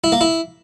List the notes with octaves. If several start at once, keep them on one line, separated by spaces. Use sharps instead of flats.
E4
A#3
E4